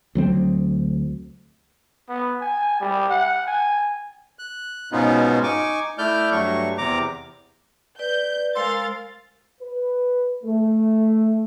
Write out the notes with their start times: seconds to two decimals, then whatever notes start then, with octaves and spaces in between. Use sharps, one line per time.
0.15 D2 F#3 C4
2.09 B3
2.41 G#5
2.80 G3
3.10 F#5
3.47 G#5
4.39 F#6
4.92 G#2 B2 B3 C#4 D#4 F4
5.43 D#4 G#5 C#6 D6
5.98 A3 E4 D5 F6 G6
6.32 G2 F#3 A3 C#6
6.78 E2 C3 A#5 D6
7.99 B4 D5 G6
8.55 G#3 A#4 C5 F5 C6 E6 A6
9.61 B4
10.44 A3